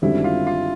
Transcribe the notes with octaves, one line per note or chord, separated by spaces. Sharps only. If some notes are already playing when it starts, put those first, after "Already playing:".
G#1 F#2 D3 G3 C4 E4
F4
F4